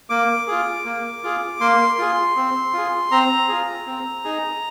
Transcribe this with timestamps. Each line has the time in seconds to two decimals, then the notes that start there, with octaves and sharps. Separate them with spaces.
0.10 A#3 D6
0.47 F4 G#4
0.85 A#3
1.23 F4 G#4
1.60 A#3 C6
1.98 F4 G#4
2.36 C4
2.73 F4 G#4
3.11 C4 A#5
3.48 F4 G#4
3.86 C4
4.24 D#4 G#4